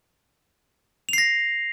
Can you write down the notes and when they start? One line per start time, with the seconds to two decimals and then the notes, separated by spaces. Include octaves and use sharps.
1.09 F7
1.13 C7
1.18 A#6